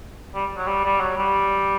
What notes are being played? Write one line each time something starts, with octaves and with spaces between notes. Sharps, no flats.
G3
F#3
G3
G3
F#3
G3